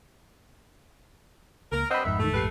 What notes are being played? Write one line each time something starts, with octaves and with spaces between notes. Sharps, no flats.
C#2 A#3 A#4
G2 C4 D#5 F#5 B5
G#1 F2 G#2 D#3 E5
A2 D#3 A3
A#1 G4 B4 C7